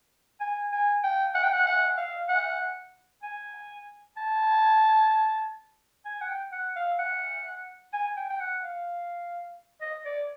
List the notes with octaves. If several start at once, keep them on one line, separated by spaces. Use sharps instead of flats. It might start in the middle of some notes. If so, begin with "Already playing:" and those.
G#5
G#5
G5
F#5
G5
F#5
F#5
F5
F#5
G#5
A5
G#5
F#5
G5
F#5
F5
F#5
G#5
G5
G5
F#5
F5
D#5
D5